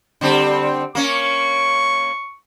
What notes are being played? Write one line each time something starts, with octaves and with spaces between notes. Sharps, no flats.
D3 G3 C4
A#3 C#4 C#6